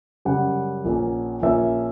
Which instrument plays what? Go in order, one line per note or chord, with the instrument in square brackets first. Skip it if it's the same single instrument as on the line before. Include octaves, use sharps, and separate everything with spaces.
[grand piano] F#2 C#3 G3 C#4 F#5
A#1 A#2 A#3 C#4
A#1 A#2 A#3 C#4 E5